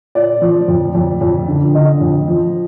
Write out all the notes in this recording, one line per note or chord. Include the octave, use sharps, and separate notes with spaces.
A#2 D5
F3
F2
F2
F2
D3
D3 D#5
F2
F3